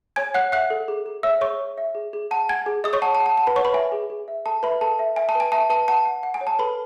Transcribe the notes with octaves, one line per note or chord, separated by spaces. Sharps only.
C#5 G#5 G#6
C#5 F#5 F#6
E5 F#5 F#6
A4
G#4
G#4
C#5 E5 E6
G#4 C#5 C#6
C#5
E5
G#4
G#4
F#5 A5
F#5 G#5 G#6
G#4
G#4 D#5 D#6
C#5 C#6
F#5 A5
A5
F#5
A5
F#5 A5
B4 B5
C#5 F#5 C#6
B4 B5
E5 G#5
G#4
G#4
E5
A4 A5
B4 E5 B5
A4 A5
E5
E5 G#5
A5
B4 G#5
E5 A5
B4 A5
F#5 A5
F#5
F#5
G#5
C#5
A5
A4 B4 B5